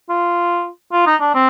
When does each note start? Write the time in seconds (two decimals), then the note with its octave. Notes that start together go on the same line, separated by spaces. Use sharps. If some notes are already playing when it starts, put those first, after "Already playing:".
0.09 F4
0.92 F4
1.06 D#4
1.21 D4
1.35 C4